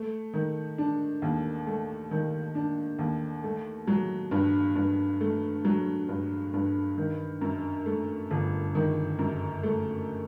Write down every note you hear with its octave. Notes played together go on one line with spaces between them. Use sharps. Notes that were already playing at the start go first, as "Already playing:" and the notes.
Already playing: A3
D#3
D4
D#2
A3
D#3
D4
D#2
A3
F#3
G2
G2
A3
F#3
G2
G2
D#3
F#2
A3
G1
D#3
F#2
A3